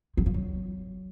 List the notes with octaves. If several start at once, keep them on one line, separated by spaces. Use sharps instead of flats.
F#3
F3
F#3